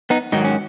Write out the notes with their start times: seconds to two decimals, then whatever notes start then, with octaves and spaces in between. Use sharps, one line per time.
0.10 B3 D#4
0.32 G#2 D#3 F#3 D#4
0.44 C#4